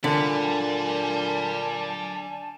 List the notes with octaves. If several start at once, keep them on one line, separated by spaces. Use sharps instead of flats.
A#2 D3 D5 G#5 A5 B5